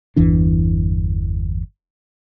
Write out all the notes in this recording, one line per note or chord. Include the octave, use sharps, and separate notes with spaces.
G1 E2 E3 D4